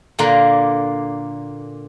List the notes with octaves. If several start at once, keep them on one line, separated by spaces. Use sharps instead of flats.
A#2 D3 A#3